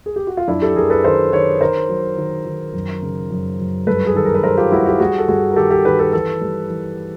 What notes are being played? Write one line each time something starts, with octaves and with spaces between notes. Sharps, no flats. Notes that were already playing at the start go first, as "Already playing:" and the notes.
G#4
G4
F#4
F4
F#2 D4 E4
G4 A4
F#2 G#4 A#4
A4 B4
D#3 A#4 C5
D#3 B4 C#5
D#3 A#4 C5
F#3
D#3
D#3
F#2
C#3
F#2
F#2
G2 A4 B4
G#4
D#3 A4
A#4
B4
G3 A#4 C5
F4 G4
G3 E4 F#4
F4 G4
G3 F#4 G#4
A4
G2 F#4 G#4
A#4
D#3 G4 A4
G4 A4
D#3 A4 B4
A4 B4
E3 A4 B4
G3
E3